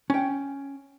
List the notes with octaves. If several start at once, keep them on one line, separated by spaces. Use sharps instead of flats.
C#4 G5